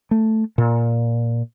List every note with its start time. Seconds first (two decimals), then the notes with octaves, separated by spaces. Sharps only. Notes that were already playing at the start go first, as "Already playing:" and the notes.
0.11 A3
0.58 A#2